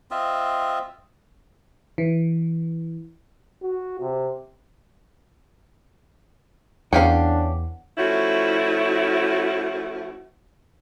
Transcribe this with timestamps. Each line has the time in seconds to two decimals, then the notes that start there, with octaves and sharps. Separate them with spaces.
0.11 C4 F4 D#5 E5
1.98 E3
3.62 F#4
4.00 C3
6.93 E2 C#4 D4 G4 F5 F#5
7.98 F3 A3 C#4 E4 F#4